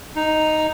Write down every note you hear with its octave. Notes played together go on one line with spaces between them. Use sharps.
D#4